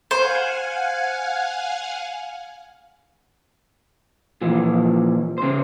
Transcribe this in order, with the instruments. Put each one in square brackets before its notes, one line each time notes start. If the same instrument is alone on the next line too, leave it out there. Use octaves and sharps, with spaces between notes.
[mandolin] C5 [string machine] F5 F#5 G#5
[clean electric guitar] A#2 E3 F3
C#3 C5